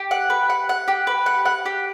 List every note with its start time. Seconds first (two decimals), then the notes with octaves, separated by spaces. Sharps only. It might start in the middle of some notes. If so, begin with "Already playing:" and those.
Already playing: G4
0.11 F#5
0.30 B4
0.50 F#5
0.69 F#5
0.88 G4
1.07 B4
1.26 F#5
1.45 F#5
1.66 G4